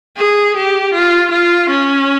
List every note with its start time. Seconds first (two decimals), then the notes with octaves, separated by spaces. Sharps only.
0.17 G#4
0.56 G4
0.94 F4
1.31 F4
1.70 C#4